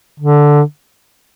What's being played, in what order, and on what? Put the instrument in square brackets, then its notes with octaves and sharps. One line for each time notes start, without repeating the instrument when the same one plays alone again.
[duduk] D3